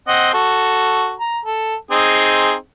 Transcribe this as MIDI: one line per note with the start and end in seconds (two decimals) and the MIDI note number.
0.08 0.29 60
0.08 0.29 75
0.08 0.29 78
0.34 1.14 66
0.34 1.14 69
1.20 1.38 82
1.45 1.75 69
1.91 2.54 60
1.91 2.54 63
1.91 2.54 68